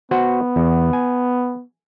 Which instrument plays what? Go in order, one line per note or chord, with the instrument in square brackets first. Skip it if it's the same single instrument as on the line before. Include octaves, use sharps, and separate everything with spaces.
[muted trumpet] B3 [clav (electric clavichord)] F#4 C5 F#5
[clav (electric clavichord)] E2
G#5